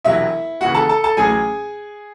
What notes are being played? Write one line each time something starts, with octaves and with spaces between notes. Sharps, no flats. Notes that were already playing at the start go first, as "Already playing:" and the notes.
E1 E2 C3 F#3 E4 E5
D#2 C#3 E3 F#4 F#5
A4 A5
A4 A5
A4 A5
A1 A2 F#3 G#4 G#5